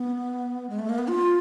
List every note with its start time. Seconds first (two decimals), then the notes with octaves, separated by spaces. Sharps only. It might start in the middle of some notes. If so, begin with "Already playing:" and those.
Already playing: B3
0.70 G#3
0.79 A3
0.89 A#3
0.98 B3
1.08 F4